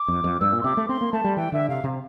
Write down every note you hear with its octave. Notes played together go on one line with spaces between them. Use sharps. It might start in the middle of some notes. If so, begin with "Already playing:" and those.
Already playing: D6
F2
F2
G2 E6
A#2
C6
C3 D6
A3
C4 C6
A#3
A3 A5
G3
E3 G5
D3 E5
C3 F5
C3